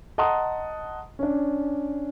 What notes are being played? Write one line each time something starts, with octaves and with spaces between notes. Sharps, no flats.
D#5 F#5 A5 A#5 C6 D#6
C#4 D4